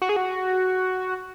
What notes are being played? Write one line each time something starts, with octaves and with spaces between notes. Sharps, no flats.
F#4
G#4
F#4